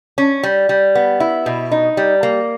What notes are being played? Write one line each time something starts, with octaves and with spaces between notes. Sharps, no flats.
C#4
G3
G3
B3
E4
B2
D#4
G3
A#3